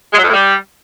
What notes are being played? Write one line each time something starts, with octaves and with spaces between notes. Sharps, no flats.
G#3
F#3
F2
A2
G3